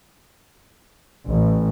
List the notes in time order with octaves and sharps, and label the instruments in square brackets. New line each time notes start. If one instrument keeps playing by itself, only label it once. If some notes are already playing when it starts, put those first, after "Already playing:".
[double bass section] A1